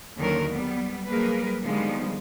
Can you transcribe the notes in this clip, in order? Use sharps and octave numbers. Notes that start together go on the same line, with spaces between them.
D#2 D3 D#3 F#3 C#4 A#4
G3 B3
F#3 G3 A#3 G#4 A#4 B4
D3 D#3 F3 G3 G#3 B3